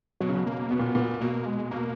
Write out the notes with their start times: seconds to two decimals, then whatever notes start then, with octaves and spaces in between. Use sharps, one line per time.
0.21 B2 F#3
0.29 C#3
0.35 B2
0.46 A#3
0.71 B2 B3
0.79 A#2
0.95 A#2
1.21 B2 A#3
1.46 G#3
1.71 B2 A#3